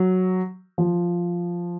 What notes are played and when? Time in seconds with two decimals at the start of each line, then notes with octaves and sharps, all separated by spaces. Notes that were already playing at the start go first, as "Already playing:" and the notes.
Already playing: F#3
0.78 F3